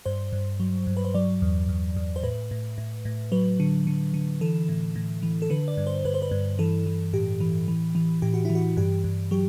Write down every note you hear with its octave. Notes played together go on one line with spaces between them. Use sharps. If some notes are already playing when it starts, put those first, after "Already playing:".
G2 C5
G2
F#3
G2
B4
C5
F#3 D5
E2
E2
E2
C5
A2 B4
A2
A2
A2
F#3 B4
D3
D3
D3
E3 A4
A2
A2
E3
A4
D3 B4
D5
G2
C5
G2 B4
C5
B4
G2
E3 A4
E3
A2 G4
E3
E3
E3
A2 G4
F#4
E3 E4
F#4
G2 G4
G2
F#3 G4